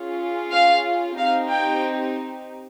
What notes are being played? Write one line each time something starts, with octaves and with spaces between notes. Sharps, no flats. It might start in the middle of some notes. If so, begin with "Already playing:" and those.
Already playing: C#4 F4 G#4
F5
C4 D#4 G4 F5
G5